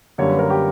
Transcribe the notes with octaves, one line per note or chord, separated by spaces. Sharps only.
F#2 D3 G3 A#3 C#5
B4
A#4
G4